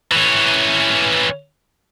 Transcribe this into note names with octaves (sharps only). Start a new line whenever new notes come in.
E3 C#4